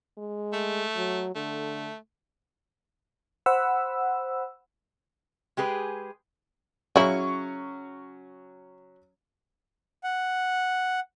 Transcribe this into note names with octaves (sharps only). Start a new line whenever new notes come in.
G#3
A3
F#3
D3 A3
C5 F#5 B5 E6
G#3 G4 G#4 B4
C#3 F#3 C#4 E4 C#6
F#5